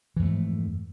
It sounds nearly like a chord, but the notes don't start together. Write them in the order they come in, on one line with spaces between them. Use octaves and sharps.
E3 F2 A3 G#2